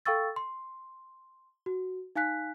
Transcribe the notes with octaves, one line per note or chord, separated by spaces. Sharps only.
A4 F5 G5 C#6 E6 A6
C6
F#4
D#4 F5 G#5 F#6 B6